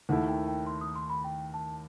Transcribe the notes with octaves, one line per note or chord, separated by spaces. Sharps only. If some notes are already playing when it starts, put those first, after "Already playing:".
D#2 D#3 A3 E4 F#5
G5
G5
C6
D#6
C6
B5
G5
A5